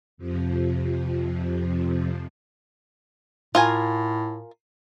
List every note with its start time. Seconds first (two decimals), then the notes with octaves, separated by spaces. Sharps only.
0.17 F2 C3 F3
3.55 A2 F4 A#4 G#5